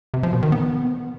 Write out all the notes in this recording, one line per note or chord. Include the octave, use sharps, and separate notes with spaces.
C3
F3
B2
D#3
B3